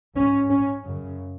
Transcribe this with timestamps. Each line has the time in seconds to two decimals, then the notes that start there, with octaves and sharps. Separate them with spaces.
0.15 G#2 C#4
0.50 C#4
0.85 F#2 C#3